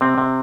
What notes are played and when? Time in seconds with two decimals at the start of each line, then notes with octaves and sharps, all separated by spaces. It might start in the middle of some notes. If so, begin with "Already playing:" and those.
0.01 C3 C4
0.18 C3